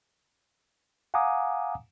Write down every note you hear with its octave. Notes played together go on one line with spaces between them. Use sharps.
F5 F#5 G#5 A#5 D6 D#6